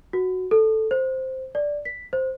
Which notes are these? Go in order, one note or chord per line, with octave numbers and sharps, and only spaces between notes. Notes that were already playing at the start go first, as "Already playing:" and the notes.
F#4
A4
C5
D5
B6
C5